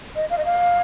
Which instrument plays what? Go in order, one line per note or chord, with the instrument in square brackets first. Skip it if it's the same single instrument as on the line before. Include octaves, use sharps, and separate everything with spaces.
[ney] D#5
F5
D#5
F5